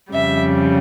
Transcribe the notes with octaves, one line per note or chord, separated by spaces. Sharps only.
F2 C#3 G3 E5